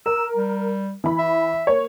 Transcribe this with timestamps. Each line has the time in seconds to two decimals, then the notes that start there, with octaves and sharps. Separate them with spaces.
0.06 A#4 E6
0.36 G3
1.04 E3 B5
1.18 E5
1.67 A#3 C#5